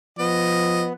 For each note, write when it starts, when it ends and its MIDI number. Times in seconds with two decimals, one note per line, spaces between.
0.19 0.92 53
0.19 0.93 59
0.19 0.86 75